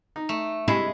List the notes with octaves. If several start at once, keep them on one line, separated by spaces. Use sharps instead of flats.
D#4
A3
G2 C3 G#3 E4 G#5